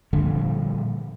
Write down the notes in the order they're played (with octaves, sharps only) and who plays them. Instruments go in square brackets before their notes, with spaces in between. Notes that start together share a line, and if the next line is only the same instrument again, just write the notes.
[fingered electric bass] A#2 D3 F3 G3